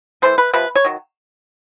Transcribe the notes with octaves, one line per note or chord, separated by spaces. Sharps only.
E3 A3 C5
B4
C3 F3 B4
C#5
D#3 F#3